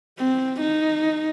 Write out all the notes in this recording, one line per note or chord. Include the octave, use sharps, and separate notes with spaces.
C4
D#4